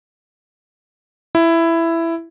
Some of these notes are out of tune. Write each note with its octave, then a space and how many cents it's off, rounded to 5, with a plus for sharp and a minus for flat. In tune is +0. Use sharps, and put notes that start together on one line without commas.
E4 +10